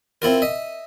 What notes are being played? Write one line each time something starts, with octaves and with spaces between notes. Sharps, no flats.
C4 E4 F4 A#4
D#5 E5